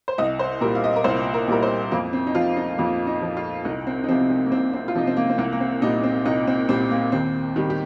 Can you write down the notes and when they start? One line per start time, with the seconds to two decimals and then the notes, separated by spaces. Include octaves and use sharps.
0.08 C5
0.18 C2 D#5
0.39 C5
0.61 A#2 G3 A#4
0.75 F5
0.84 D#5
0.96 A#4
1.04 C2 C5
1.34 A#4
1.48 A#2 G3 A#4
1.63 C5
1.92 F2 A#3
2.13 C4
2.27 D#4
2.35 F3 F4
2.57 D#4
2.78 F2 A#3
3.07 D#4
3.22 F3
3.37 F4
3.65 C2 D#4
3.87 C4
4.04 D#4
4.09 C3 F3 C4
4.30 D#4
4.46 A#3
4.52 C2 C4
4.73 C4
4.88 F4
4.95 C3 F3 D#4
5.07 C4
5.17 A#3
5.30 C4
5.38 C2 A#3
5.52 A#3
5.60 C4
5.82 A#2 G3 D#4
6.04 C4
6.25 C2 D#4
6.47 C4
6.69 A#2 G3 C4
6.91 A#3
7.12 D#2 C4
7.56 D#3 G3
7.70 G4